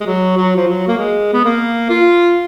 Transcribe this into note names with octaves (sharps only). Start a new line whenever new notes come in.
G#3
F#3
F#3
F3
F#3
A#3
G#3
B3
A#3
F4